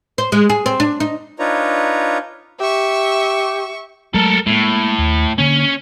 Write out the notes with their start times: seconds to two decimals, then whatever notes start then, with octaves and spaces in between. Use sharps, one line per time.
0.18 C5
0.32 G#3
0.49 G#4
0.66 C4
0.80 D4
1.00 D#4
1.39 D4 D#4 F4 B4 C#5 A#5
2.60 G4 E5 C#6
4.14 F#3 G#3 A3 A4 A#4
4.46 A2 G#3 A#3
4.98 D#2
5.38 D3 A#3 C#4